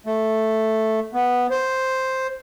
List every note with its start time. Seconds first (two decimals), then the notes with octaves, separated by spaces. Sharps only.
0.06 A3
1.14 B3
1.51 C5